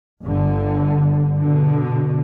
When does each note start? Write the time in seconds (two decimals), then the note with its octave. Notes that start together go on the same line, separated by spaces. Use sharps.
0.23 G1 D3
1.37 B2 D3